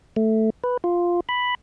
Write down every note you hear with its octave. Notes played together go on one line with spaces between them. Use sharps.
A3
B4
F4
B5